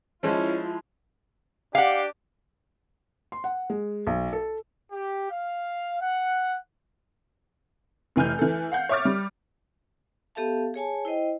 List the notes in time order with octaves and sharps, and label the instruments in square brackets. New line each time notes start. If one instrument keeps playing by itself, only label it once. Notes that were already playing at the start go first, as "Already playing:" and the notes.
[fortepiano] F3 G#3 [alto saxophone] C#4 [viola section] E4 F4
[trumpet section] D4 G4 [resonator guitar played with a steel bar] F5 F#5
[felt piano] C6
F#5
G#3
B1
A4
[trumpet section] G4
F5
F#5
[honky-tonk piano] F1 E3 G#5 F6 G6
E3 A4
F5 F#5 G6
C#5 E5 C#6 D6 F6 A6
G3
[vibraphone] B3 G4 A4 E5 F5 A5
G#4 C#5 G#5 A5
E4 C5 D#5 G5